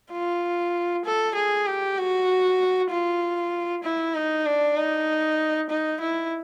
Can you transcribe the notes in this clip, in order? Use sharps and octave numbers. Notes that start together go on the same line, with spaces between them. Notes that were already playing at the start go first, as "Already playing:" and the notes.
F4
A4
G#4
G4
F#4
F4
E4
D#4
D4
D#4
D#4
E4